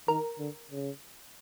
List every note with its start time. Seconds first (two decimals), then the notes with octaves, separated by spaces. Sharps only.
0.08 D#3 A#4
0.39 D3
0.71 C#3